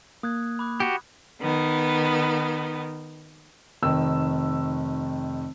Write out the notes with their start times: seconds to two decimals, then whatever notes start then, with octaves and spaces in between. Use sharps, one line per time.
0.23 A#3 D#6 F#6 G#6
0.59 B5 D6 F#6
0.80 F#4 G4
1.40 D#3 B3
3.82 F1 D#3 E6